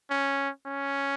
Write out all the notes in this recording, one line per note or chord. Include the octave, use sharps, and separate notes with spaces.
C#4
C#4